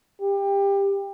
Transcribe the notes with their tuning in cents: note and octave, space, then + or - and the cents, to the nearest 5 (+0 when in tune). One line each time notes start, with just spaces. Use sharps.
G4 +20